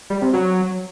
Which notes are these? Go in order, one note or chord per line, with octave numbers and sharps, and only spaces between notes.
G3
C3
F#3